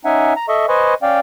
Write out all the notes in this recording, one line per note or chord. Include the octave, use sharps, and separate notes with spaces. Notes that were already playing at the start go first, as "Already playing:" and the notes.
C#4 D#4 E5 F#5 G#5
A#5
A4 D#5 E5 C#6
B4 C5 D#5 G#5 C#6
C#4 D5 F5 G5